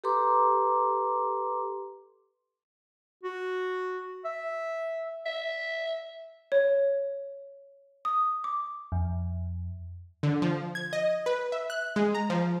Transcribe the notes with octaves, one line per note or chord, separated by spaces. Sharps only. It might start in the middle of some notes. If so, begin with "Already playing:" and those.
G4 A4 B4 A#5 C6 D6
F#4
E5
E5
C#5
D#6
D6
F2
D3
F3
G#6
D#5
B4
E5
F#6
G#3
A#5
F3